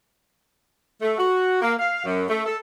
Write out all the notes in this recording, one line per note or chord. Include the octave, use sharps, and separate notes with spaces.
A3
F#4
A#3
F5
F#2
A3
A4